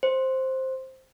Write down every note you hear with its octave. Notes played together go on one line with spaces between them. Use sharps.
C5